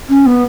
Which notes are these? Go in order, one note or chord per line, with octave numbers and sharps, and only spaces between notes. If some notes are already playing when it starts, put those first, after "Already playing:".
C#4
B3